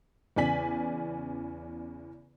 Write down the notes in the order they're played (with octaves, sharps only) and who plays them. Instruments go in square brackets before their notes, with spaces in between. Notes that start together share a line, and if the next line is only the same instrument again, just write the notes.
[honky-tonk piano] E2 C#3 D5 G#5 B6 F#7